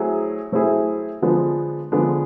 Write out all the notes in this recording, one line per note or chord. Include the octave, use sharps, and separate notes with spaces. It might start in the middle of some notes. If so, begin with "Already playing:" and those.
Already playing: F#3 A3 C4 E4 G#4
F#3 A3 C4 E4 G#4
D3 F3 G#3 B3 D4
D3 F3 G#3 B3 D4